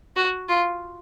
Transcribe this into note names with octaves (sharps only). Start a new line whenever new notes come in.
F#4
F4